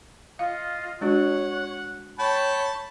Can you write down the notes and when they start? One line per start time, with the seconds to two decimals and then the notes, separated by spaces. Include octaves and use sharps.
0.39 F4 D#5 F5
1.01 G#3 D4 F#4 C#5 F#5
2.19 C#5 G5 A5 B5